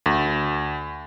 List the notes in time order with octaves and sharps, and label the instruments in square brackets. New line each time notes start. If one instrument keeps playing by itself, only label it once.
[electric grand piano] D2